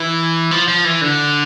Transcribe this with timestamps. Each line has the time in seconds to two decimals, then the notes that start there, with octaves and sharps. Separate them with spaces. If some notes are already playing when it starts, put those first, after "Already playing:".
Already playing: E3
0.51 F3
0.68 F3
0.85 E3
1.01 D3